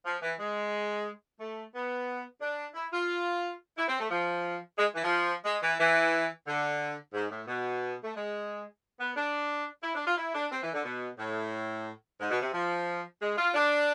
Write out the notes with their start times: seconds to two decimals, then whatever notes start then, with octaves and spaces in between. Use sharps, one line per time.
0.05 F3
0.22 E3
0.39 G#3
1.40 A3
1.74 B3
2.41 D4
2.75 E4
2.92 F4
3.76 E4
3.88 C4
3.99 A3
4.10 F3
4.78 G#3
4.95 E3
5.03 F3
5.44 G#3
5.62 E3
5.79 E3
6.47 D3
7.14 G#2
7.30 A2
7.47 B2
8.04 A3
8.15 G#3
9.00 B3
9.16 D4
9.83 E4
9.95 D4
10.06 F4
10.17 E4
10.34 D4
10.51 C4
10.62 E3
10.73 D3
10.84 B2
11.18 A2
12.20 G#2
12.30 B2
12.41 C3
12.53 F3
13.21 G#3
13.37 F4
13.54 D4